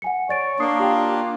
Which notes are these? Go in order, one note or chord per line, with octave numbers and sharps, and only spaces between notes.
F#5 G#5 C#7
C#5 D5 A6 D7
A#3 D4 C#6 D#6 C7
F4 G4 G5